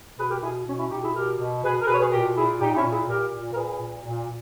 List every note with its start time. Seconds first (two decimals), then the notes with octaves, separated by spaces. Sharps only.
0.18 B2 G#4 B4
0.30 G4 A#4
0.42 B2 E4 G#4
0.66 B2 C#4
0.78 C#4 E4
0.91 B2 D#4 G4
1.03 E4 G#4
1.15 B2 G4 A#4
1.39 B2
1.64 B2 G#4 B4
1.82 A#4
1.87 B2 G#4 B4
1.94 C#5
2.00 G#4 B4
2.11 A#2 G4 A#4
2.35 A#2 E4 G#4
2.61 A#2 D#4 G4
2.72 D#4
2.76 C#4 E4
2.84 A#2
2.92 E4 G#4
3.08 A#2 G4 A#4
3.32 A#2
3.53 A#4
3.56 A#2 G#4 B4
3.80 A#2
4.04 A#2